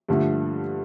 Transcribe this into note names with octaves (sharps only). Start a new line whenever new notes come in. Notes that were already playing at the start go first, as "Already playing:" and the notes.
G2 D3 F3 A3